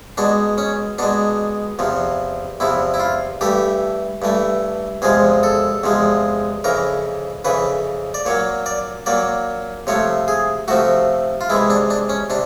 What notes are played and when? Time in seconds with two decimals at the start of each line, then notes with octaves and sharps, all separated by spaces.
0.17 B2 G#3 D4
0.58 C#4
0.98 B2 G#3 D4
1.79 E2 C3 F3
2.60 E2 C3 F3 E4
2.94 E4
3.00 F4
3.41 G2 E3 A3 G4
4.22 G2 E3 A3
5.02 E2 C3 F3 G#3 G#4
5.43 A4
5.84 E2 C3 F3 G#3
6.64 F2 C#3 E3 A#4
7.45 F2 C#3 E3 B4
8.14 D5
8.26 A#2 F#3 A#3 C#5
8.66 D5
9.06 A#2 F#3 A#3 D5
9.87 C3 F3 A3 C#5
10.28 G#4
10.68 C3 F3 A3 F#4
11.41 F4
11.50 C3 E3 G#3 E4
11.70 D4
11.90 D4
12.09 C#4
12.30 C3 D4